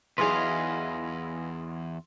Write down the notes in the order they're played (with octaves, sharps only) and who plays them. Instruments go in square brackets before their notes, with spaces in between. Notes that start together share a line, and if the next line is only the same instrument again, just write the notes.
[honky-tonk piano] B1 E3 G#4 [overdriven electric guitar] E2 [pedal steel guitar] B4 D#5 F5 [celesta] C6